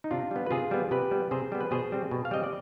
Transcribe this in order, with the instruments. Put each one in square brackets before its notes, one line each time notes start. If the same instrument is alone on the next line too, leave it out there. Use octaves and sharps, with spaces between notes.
[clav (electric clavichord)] D#4
C3 D4 F4
G3 B3
B4
C3 F4 G#4
G3 B3
C3 G4 B4
G3 B3
C3 G#4 C5
G3 B3
B4
B2 G#4 C5
G3 C4
B2
F5
G3 C4 D#5
D5